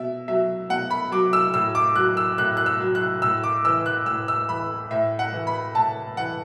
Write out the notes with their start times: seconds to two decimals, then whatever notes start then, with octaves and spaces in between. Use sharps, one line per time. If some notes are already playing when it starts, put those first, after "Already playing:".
Already playing: B2 E5
0.28 F#3 E5
0.69 B2 F#5
0.91 B5
1.12 F#3 D6
1.33 E6
1.54 A2 E6
1.75 D6
1.96 F#3 F#6
2.17 E6
2.38 A2 F#6
2.57 F#6
2.66 E6
2.80 F#3
2.95 F#6
3.22 A2 E6
3.44 D6
3.65 E3 E6
3.86 F#6
4.06 A2 E6
4.28 E6
4.49 E3 B5
4.91 A2 E5
5.19 F#5
5.33 E3
5.47 B5
5.75 A2 A5
6.17 E3 F#5